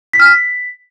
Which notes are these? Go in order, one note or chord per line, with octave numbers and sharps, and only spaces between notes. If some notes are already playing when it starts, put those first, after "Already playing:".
B6
F6
B6